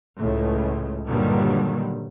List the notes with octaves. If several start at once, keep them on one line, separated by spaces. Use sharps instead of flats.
C#2 A2
G2 A#2 D3 D#3 F#3 G3